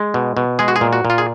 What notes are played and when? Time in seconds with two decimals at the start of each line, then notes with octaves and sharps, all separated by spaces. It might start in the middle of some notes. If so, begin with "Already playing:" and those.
Already playing: G#3
0.14 B2
0.37 B2
0.59 G#3 G#4
0.68 F#4
0.76 G#4
0.81 A#2
0.93 F#4
1.05 A#2
1.10 F4
1.18 G#4